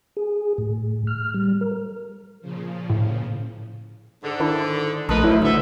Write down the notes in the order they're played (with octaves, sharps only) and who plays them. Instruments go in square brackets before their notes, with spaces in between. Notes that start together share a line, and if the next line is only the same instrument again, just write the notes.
[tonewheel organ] G#4
A2
F6
G3
A#4
[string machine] A#2 C#3 F3
[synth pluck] A2
[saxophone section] G#2 D3
[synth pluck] D#3 D4 E4
[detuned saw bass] A#1 [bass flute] A3 [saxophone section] D#4 A#4 B4 [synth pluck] A5 C6 D#6
[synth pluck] A1 F#3 [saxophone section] F3 [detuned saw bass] E4
[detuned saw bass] D3 [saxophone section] A4 B4 E5 [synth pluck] D#6